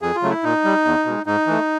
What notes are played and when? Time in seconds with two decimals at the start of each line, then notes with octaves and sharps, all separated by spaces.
0.02 F2 G#4
0.16 F4
0.22 C#3 F#3 A3
0.30 E4
0.43 A#2 D#4
0.64 G3
0.85 E2
1.06 B2 G#3
1.26 G#2 D#4
1.47 E3 A3